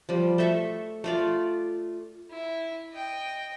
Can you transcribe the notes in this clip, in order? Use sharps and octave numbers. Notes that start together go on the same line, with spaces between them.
F3 G3
A3 A4 E5 C#6
A3 F4 D5
E4
D#5 G5